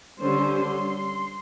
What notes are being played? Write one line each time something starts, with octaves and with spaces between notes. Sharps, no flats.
D3 G3 C#4 C5
C6